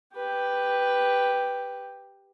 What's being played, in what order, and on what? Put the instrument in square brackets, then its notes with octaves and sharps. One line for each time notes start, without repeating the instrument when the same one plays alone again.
[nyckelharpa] G4 B4